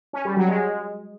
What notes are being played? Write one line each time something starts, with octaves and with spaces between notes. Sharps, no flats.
C#4
G3
F#3
G#3